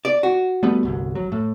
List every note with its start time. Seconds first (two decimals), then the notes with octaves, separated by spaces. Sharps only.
0.05 D5
0.23 F#4
0.63 G3 A3 B3
0.83 G1 C2
1.15 F#3
1.32 A2